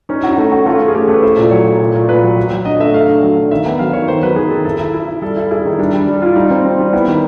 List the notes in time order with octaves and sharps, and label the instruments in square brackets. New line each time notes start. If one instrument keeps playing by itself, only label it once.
[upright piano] C#4 [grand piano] D#4
[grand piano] E4 [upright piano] F#4
[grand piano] D#4
[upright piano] A3
F#4
[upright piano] A3 [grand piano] F4
[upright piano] C#4
[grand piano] G#4
[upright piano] A3 [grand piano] G4
[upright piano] A3
[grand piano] B4
[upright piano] E4 [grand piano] C5
[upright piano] A#2
[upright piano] F#3 [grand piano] C#5
[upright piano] F#3
A#2
A#2
[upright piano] A#2 [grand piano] B4
[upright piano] F#3
F#3
F#3
[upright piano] D3 [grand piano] D#5
[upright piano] A3 [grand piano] E5
[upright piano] A3 [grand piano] F5
[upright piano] D3
F#3
D3
[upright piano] D#3 [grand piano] E5
[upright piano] B3
[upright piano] F#3 [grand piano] F5
[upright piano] D#3 [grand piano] C#5
[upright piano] D#3 [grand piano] C5
[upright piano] F#3 [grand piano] B4
[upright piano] D#3 [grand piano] G#4
[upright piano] D#3 [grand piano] A4
[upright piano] E4 [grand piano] A4
[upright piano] E4
E4
E4
[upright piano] G3 [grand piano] A4
[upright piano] E4 [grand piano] A4
[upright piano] E4 [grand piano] G#4
[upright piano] D#3 [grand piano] D#4
[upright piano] G3 [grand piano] D4
[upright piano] G3
G3
[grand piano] E4 [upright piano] F4
[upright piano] G3 [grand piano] D#4
[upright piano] C4
C4
G3
[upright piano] B3 [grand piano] E4
[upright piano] D#3